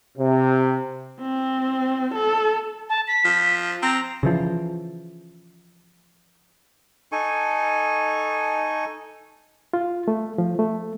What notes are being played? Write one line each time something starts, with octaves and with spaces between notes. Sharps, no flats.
C3
C4
A4
A5
B6
F3
C4 A#5
C#3 E3 F3
D#4 A4 G#5 C#6
F4
A3
F3
A3